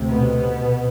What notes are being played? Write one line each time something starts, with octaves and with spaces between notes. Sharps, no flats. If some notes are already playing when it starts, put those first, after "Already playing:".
Already playing: D2 C3
B2 B3